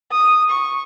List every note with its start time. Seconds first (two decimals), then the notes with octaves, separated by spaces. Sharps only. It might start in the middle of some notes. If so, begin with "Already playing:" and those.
0.12 D#6
0.50 C#6